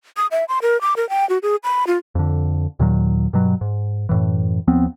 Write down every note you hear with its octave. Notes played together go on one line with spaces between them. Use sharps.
D#6
E5
C6
A#4
D6
A#4
G5
F#4
G#4
B5
F4
F2 D3
D#2 A#2 D#3 F#3
G2 B2 F#3
G#2
F#2 A2 E3
D#2 F3 B3 C4